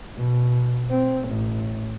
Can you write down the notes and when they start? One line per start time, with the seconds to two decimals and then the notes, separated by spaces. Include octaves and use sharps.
0.16 B2
0.90 C4
1.29 A1